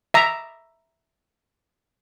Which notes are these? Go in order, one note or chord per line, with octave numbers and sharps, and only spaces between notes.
E5 A#5